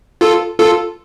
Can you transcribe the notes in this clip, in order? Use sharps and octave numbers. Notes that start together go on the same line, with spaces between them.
F4 A4
F4 A4